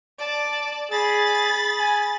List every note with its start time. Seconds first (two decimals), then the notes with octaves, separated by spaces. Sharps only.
0.19 D5 A5
0.91 G#4 B5 A6
1.79 G#5